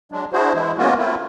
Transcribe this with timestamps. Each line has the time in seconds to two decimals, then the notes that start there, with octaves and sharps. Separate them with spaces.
0.12 F#3 G#3 D4
0.33 D4 E4 F#4 G#4 C5
0.54 E3 G#3 E4
0.78 G#3 A#3 B3 C#4 F4 F#4
0.98 A3 A#3 C4 E4 F4